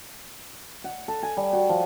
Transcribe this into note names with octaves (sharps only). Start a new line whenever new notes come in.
F#5
A4
G#5
G3
F#4
F3